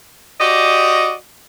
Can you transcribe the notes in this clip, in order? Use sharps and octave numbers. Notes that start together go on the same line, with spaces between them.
F#4 G4 D5 D#5